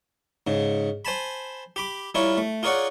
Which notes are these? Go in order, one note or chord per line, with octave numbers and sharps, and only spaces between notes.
G#2 C#3
C5 G#5 A5 B5
G4 B5 D6
G3 E4 F4 A#4 C#5
A3
F4 G#4 A#4 C#5 D5 F#5